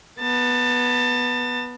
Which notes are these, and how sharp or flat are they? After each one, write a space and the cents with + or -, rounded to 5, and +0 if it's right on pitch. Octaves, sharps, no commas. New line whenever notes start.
B3 -10 A5 +25